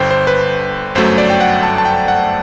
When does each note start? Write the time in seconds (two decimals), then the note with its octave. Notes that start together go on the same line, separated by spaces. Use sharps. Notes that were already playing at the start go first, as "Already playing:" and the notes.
Already playing: G1 G2 D3 C5 G5
0.11 C5
0.27 B4
0.95 G1 F#2 F#3 A3 C5
1.18 D5
1.30 G5
1.41 F#5
1.63 A5
1.78 A5
1.85 G5
2.08 F#5